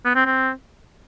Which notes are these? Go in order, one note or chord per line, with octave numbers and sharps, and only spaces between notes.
B3
C4
C4